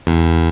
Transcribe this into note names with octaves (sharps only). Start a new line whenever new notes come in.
E2